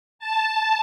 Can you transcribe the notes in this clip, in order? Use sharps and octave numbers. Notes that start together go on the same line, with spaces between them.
A5